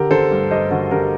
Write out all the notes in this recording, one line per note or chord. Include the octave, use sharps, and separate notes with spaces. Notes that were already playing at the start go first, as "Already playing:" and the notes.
Already playing: D3 G4 A#4
D3 A4 C5
G2
G2 C5 D#5
D3 F#4 A4
D3 G4 A#4